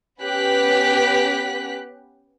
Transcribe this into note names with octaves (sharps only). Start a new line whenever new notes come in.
B3 C#4 G4 B4 F#6 B6